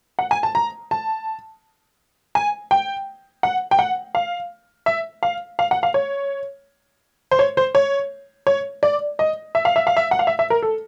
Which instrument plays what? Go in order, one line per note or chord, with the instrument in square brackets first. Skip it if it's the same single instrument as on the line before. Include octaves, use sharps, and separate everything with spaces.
[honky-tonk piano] F#5
G#5
A5
A#5
A5
G#5
G5
F#5
G5
F#5
F5
E5
F5
F5
F#5
F5
C#5
C5
C#5
C5
C#5
C#5
D5
D#5
E5
F5
E5
F5
E5
F#5
F5
E5
E5
A#4
A4